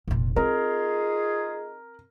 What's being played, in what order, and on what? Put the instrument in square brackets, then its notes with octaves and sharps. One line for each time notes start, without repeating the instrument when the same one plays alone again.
[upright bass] F1 A#2
[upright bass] C4 [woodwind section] D#4 F4 G#4 [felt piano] A#4